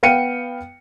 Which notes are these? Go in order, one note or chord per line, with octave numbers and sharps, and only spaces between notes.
B3 F5 G5 C#7 D#7